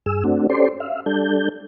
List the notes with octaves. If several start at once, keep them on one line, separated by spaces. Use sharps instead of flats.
G2 G#4 E6
A3 C4 D4 F#4
C#4 G4 A4 C5 D5 C6
E5 F5
G3 D4 A4 G6